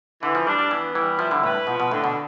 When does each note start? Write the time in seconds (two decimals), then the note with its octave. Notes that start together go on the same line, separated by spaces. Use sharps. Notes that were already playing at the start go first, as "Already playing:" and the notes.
0.23 D3 E3
0.35 F3
0.47 G3 D4
0.59 G3
0.71 E3 B3
0.95 E3 G3
1.19 F3 E4
1.31 D3
1.44 A2 B4
1.67 B2 F3
1.80 B2
1.91 A2 D3
2.04 B2